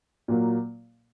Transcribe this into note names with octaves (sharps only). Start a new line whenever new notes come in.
A#2 F#3 A#3